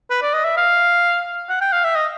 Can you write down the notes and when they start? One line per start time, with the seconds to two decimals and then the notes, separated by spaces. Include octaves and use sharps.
0.10 B4
0.22 D5
0.33 D#5
0.44 E5
0.57 F5
1.49 F#5
1.61 G5
1.72 F5
1.84 E5
1.95 D#5